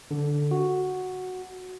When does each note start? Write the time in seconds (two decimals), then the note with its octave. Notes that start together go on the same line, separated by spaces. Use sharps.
0.11 D3
0.51 F#4